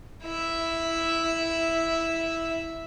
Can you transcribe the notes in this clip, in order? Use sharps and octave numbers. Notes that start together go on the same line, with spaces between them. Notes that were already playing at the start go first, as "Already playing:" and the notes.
E4 E5